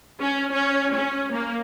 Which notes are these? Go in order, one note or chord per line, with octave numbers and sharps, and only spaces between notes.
C#4
C#4
C#4
A#3